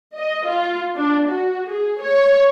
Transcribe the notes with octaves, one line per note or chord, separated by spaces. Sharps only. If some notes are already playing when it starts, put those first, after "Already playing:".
D#5
F4
D4
F#4
G#4
C#5